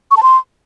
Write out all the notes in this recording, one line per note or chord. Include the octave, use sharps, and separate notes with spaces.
C#6
A5
C6